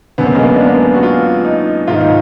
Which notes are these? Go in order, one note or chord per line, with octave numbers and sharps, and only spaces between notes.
F#2 D3 B3
A#3
G#3
A#3
D4
B3
F#4
F4
D#4
G#2 D#3 F4
D#4